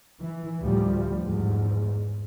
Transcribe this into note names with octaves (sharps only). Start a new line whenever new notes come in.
E3
D2 A2 F3 G3
E2 G#2